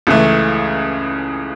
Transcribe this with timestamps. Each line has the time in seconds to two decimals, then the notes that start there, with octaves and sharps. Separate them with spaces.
0.07 C#2 C#3 E3 A3